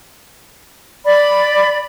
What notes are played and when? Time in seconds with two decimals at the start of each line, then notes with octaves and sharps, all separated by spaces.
1.05 D5 B5